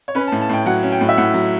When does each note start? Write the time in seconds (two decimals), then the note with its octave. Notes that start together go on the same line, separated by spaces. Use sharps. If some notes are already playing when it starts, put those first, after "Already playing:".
0.08 C#5
0.15 C#4 B4
0.27 A5
0.32 A2
0.41 A5
0.49 A2 G5
0.66 F#3 F#5
0.83 C#4
0.92 G5
1.01 A2
1.09 E5
1.18 A2 F#5
1.34 F#3